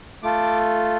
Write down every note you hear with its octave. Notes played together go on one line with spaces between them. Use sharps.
A3 F4 A4 D6